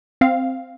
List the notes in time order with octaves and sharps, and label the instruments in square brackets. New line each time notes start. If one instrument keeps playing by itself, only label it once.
[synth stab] C4 F5